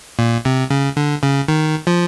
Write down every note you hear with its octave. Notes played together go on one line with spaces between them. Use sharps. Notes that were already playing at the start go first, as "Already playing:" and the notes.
A#2
C3
C#3
D3
C#3
D#3
F3